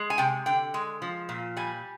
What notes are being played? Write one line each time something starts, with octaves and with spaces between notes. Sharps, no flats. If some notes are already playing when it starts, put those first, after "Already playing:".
Already playing: G#3
G#5
C3 G5
D3 G5
G#3
F3
A#2
G3 G#5